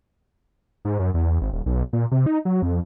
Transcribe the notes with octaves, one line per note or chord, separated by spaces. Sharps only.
G#2
F#2
E2
G#1
D#1
B1
A#2
C3
D#4
F#3
F2